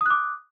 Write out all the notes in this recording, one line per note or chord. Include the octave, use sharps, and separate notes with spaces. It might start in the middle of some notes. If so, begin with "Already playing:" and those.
D6 D#6 F#6